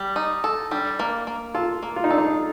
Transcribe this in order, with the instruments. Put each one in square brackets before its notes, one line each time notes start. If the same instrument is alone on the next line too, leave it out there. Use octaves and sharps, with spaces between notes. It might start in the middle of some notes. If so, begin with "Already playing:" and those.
Already playing: [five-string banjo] G3
D#4
A4
[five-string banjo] G3 [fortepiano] D4
[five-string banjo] A#3
A#3
[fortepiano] F4 [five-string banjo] A4
[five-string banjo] A#3
[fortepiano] F4
D#4
[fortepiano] D4 [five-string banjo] A4
[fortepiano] D#4